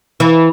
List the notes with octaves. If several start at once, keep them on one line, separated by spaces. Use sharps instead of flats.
E3